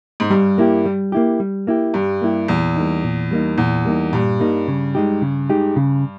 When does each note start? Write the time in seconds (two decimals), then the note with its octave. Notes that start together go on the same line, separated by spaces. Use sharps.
0.20 G#2
0.30 G2 G3
0.58 A#3 E4 G4
0.86 G3
1.12 A#3 E4 G4
1.40 G3
1.67 A#3 E4 G4
1.94 G2 G3
2.22 A#3 E4 G4
2.48 E2 A#2
2.76 G3 A#3 D#4
3.04 A#2
3.31 G3 A#3 D#4
3.58 E2 A#2
3.85 G3 A#3 D#4
4.13 G2 A#2
4.40 G3 A#3 D#4
4.68 C#3
4.95 G#3 D#4 G4
5.22 C#3
5.49 G#3 D#4 G4
5.76 C#3